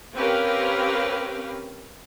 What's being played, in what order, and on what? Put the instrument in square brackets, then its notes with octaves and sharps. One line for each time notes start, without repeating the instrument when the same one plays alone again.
[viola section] C4 C#4 G4 A#4 B4 F5